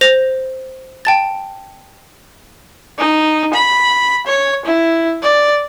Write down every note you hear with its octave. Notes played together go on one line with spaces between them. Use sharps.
C5 A#6 F7
G5 A5 A6
D#4
B5
C#5
E4
D5